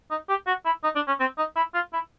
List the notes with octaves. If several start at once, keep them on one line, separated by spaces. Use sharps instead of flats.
D#4
G4
F#4
E4
D#4
D4
C#4
C4
D#4
E4
F4
E4